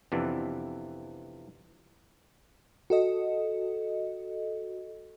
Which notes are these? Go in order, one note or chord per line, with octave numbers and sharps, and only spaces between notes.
F2 C3 E3 B3 D4
F#4 A4 D#5